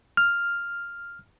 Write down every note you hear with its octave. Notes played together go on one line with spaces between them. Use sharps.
F6